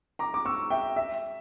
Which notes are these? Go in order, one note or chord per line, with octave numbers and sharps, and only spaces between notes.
A#5 D6
D6
C#6 E6
E5 G5
E5